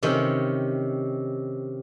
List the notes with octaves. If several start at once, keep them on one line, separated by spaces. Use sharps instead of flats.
C3 D#3 C#4